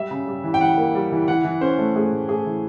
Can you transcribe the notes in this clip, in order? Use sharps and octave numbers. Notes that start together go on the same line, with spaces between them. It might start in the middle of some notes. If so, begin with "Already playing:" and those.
Already playing: G3 E5
C#3
G3
E3
G5
E3 F#5
A#3
G3
E3
E3 F#5
E3
C#4 C5
A3
A3 G#4
A2
A3 G#4
E3